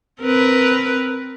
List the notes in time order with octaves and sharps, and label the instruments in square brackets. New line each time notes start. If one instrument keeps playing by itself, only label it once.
[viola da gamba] C4 A#4 B4